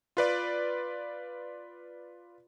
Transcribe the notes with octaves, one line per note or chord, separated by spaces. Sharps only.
F4 B4 D5